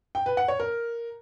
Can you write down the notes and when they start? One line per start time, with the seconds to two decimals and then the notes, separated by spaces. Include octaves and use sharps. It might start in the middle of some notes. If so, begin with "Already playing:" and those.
0.15 G5
0.26 B4
0.37 F#5
0.48 C#5
0.60 A#4